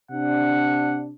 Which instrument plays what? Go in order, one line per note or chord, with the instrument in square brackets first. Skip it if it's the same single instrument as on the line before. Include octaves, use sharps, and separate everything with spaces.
[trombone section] C3 D4 [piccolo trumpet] F#5